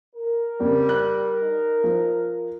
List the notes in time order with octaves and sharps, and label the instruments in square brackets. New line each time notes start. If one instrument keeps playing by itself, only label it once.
[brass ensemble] A#4
[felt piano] F2 C#3 [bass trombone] G3
[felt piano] F#6
[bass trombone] D#4
[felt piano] F3